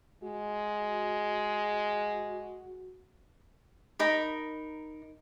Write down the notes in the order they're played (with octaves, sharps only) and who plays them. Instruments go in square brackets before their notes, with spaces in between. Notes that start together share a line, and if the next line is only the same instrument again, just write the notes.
[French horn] G#3 [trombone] F#4
[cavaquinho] D#4 A#4 B5